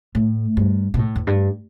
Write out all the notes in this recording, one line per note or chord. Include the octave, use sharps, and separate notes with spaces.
A2
G2
B2
A2
E2
G2